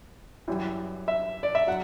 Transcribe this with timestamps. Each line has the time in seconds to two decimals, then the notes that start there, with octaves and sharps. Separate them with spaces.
0.48 F#2 E3 G3
1.08 E5
1.43 D5
1.55 E5
1.67 F#3 F#5